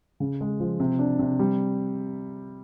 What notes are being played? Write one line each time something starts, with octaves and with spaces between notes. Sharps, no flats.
C#3
G#3
F3
C3
D4
C3
G3